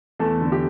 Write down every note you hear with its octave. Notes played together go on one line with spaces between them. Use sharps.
E2 A3 A4
D3
G4